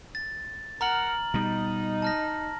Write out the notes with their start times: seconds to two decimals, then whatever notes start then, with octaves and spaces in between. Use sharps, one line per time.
0.15 A6
0.81 A#4 F#5 A#5 F6 F#7
1.34 B2 G3 D#4
2.02 A5 F6 A#6